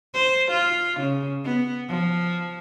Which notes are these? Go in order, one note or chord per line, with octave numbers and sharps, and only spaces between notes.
C5
F4
C#3
B3
F3